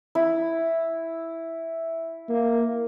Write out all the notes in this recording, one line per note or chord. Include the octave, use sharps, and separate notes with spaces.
E4
A#3